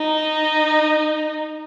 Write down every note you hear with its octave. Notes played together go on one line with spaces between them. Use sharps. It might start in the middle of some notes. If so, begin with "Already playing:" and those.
Already playing: D#4